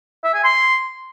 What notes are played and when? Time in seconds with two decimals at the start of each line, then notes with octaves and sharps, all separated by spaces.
0.24 E5
0.34 G#5
0.44 C6